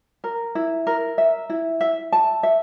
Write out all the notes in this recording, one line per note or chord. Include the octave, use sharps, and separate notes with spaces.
A#4
E4
A#4
E5
E4
E5
A5
E5